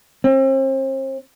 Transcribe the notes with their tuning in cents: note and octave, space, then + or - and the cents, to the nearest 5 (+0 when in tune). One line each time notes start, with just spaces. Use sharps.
C4 +40